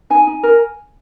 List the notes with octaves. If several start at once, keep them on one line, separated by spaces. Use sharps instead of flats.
D#4 G#5
D#4
A#4